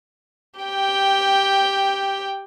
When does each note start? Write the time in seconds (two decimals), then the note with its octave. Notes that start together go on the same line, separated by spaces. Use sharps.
0.60 G4 G5